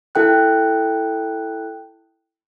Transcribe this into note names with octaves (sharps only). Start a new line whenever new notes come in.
E4 A4 G5 F#6